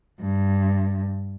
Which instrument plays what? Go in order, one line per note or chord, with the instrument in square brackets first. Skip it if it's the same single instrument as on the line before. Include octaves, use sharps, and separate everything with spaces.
[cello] G2